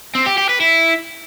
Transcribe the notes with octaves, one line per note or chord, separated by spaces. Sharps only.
C4
G4
G4
B4
E4